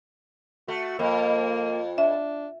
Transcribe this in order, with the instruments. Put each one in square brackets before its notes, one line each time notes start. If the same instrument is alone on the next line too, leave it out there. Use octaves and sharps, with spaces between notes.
[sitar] A3 [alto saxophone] F#4
[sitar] F2 [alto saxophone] A#3
[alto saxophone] D4 [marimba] E5